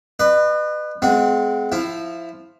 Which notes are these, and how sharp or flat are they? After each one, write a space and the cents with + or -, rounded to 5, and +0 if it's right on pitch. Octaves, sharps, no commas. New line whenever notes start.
B4 +10 D#5 -40
G#3 +25 C4 -40 F#4 -30
F3 +0 E4 +15